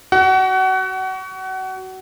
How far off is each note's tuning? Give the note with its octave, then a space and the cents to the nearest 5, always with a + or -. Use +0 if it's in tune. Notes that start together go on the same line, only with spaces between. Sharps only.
F#4 +25 F#5 +30